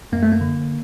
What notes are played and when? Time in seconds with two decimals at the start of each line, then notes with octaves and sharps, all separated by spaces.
0.12 F#2 A#3
0.23 A3
0.32 A#3
0.41 D3